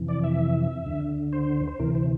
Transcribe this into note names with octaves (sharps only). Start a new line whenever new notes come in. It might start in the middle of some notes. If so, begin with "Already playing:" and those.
Already playing: F2 C3 E3
D5
E5
D2 D3
C5
C5
D2 C3 E3 A#4
C5